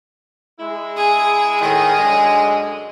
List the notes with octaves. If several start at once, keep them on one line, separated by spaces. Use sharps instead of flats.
G#3 E4
G#4
A2 D#3 G#4
F#2 D3 G#3